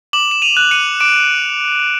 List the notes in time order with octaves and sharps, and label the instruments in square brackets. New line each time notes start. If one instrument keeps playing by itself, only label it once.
[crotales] D6 E7 F#7
E7
D#7 F7
F#6
C#7 D#7
D6 D7 E7